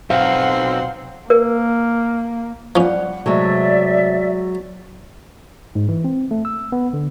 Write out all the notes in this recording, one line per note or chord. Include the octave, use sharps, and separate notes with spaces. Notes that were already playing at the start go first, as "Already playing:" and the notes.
B1 C4 F5 F#5 C6
A#3 A#4
F3 G3 C#4 F#5
C3 F#3 G#3 A3 D5 E5
G#2
E3
C4
A3
E6
B3
D3